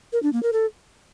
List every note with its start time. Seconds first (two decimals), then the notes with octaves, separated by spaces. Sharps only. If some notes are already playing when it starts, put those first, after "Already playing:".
0.13 A#4
0.23 D4
0.33 A#3
0.43 A#4
0.53 A4